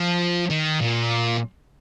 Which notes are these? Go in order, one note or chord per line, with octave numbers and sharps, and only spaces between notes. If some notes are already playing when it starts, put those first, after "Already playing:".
Already playing: F3
D#3
A#2